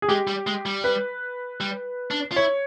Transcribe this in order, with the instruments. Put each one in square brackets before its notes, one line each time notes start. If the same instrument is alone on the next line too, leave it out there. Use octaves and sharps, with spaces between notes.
[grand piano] G#4
[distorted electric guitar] G#3 [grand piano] G4
[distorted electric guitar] G3
G#3
G3
[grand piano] B4
[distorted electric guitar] G3
D4
F4
[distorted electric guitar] E4 [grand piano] C#5